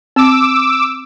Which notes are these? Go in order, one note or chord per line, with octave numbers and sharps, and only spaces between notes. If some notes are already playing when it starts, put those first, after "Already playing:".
C4 D6 E6